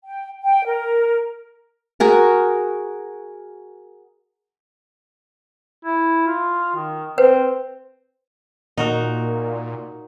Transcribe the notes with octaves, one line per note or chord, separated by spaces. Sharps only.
G5
G5
A#4
F#4 G#4 A#4
E4
F4
D#3
C4 B4 C5
A#2 D#4 F#4 A#4